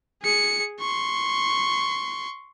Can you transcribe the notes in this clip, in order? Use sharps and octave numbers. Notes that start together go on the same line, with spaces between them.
G#4 C#7
C6 C#6